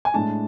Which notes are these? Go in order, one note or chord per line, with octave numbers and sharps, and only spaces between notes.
G#5
A2 G#3 D4 A5